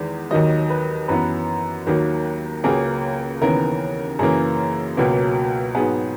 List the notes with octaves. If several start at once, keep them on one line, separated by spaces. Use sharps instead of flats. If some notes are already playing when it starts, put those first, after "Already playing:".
Already playing: E2 D#3 G#3
D#2 D#3 F#3 D#5
B4
F#2 E3 B3 B4
D#2 D#3 F#3 A#3
C#2 C#3 F#3 A#3 G#4
D#2 C#3 E3 B3 A#4
F#2 C#3 E3 A#3 G#4
C#2 B2 F#3 A#3
G#2 F#3 B3 G#4